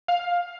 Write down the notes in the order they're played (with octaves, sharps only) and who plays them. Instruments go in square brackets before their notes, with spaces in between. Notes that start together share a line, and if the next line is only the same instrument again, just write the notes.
[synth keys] F5